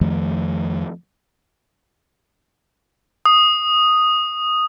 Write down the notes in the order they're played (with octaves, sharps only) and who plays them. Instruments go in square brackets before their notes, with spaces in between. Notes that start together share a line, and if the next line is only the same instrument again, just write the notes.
[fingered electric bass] F2 D#3 F3 A3
[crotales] D#6